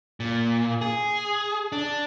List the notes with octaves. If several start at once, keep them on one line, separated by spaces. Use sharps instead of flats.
A#2
G#4
D4